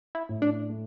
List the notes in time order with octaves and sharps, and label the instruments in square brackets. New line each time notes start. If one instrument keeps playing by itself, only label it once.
[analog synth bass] E4
[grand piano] A2
[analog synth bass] D4
[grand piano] A3